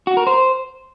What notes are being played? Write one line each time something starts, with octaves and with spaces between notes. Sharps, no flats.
F#4
A#4
C5